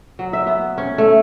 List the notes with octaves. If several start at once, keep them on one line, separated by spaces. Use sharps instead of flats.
F#3
E5
B3
C#4
A3